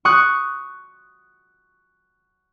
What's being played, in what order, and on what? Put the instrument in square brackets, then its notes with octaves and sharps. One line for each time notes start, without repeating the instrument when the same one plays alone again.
[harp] C#6 D#6 F#6